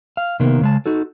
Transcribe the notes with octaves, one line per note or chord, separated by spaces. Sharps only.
F5
C3 D#3 A#3 B3
C#3 G#3 A5
D#4 F#4 A4